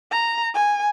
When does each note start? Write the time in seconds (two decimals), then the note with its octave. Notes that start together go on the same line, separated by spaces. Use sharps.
0.11 A#5
0.54 G#5